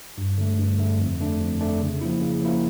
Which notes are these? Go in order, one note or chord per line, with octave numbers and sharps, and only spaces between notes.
G2
D3 A3
G2
D3 A3
F2
D3 A3 D4
F2
D3 A3 D4
C#3
F3 A#3 E4
C#3
F3 A#3 E4